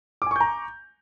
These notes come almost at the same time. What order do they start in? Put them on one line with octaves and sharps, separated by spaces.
D6 G#5 C#6 G6 A#5